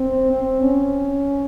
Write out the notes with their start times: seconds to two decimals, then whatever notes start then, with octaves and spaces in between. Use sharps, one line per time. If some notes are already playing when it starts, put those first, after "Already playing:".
Already playing: C4
0.32 C4
0.62 C#4